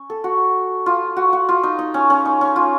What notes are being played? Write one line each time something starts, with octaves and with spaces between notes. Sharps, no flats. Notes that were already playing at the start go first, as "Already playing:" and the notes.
Already playing: C#4
A4
F#4
F4
F#4
F#4
F4
D#4
D#4
C#4
C#4
D#4
C#4
F4